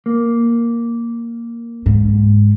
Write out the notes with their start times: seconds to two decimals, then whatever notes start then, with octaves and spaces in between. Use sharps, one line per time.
0.06 A#3
1.86 G#2